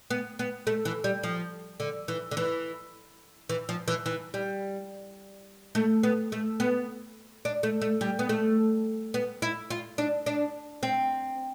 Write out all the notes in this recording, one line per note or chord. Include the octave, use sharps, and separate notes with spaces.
B3
B3
A3
E3
G3
F3
D3
E3
D3
E3
E3
F3
E3
E3
G3
A3
B3
A3
B3
D4
A3
A3
G3
B3
A3
B3
E4
F4
D4
D4
C4